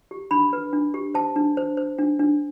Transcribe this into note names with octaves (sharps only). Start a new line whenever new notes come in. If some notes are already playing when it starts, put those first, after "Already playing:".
G4
D4 B5
B4
D4
G4
C5 A5
D4
C5
C5
D4
D4